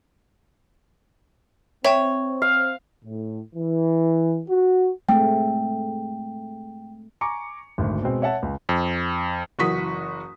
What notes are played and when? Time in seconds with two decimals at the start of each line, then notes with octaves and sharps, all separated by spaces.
1.84 C4 C#5 E5 G5 E7
2.42 F5
3.05 A2
3.55 E3
4.49 F#4
5.09 G#3 A3 C4 G5
7.21 G#5 A#5 C#6 D6 C#7
7.78 G#1 D2
8.02 B2 G#3 C4
8.22 C#5 E5 F#5 A5
8.42 C#2
8.69 F2
9.59 F#1 E3 F#4 C#6 D#6 B6